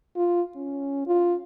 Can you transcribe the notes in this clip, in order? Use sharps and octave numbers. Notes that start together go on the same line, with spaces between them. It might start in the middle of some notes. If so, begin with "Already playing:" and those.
F4
C#4
F4